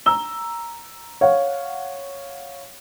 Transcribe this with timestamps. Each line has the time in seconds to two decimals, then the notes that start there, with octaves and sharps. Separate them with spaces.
0.06 A#5 E6 G7
1.21 C#5 F5 F#5